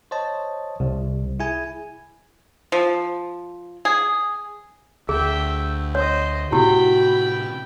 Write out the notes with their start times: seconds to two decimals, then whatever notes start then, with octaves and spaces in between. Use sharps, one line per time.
0.11 C5 C#5 D#5 A5
0.80 C2
1.40 E4 G#4 G#5
2.72 F3
3.85 G#4
5.09 D2 G#4 E5 G5
5.95 C5 C#5 D#5
6.52 A2 C3 E4 F#4 G4 G5 B5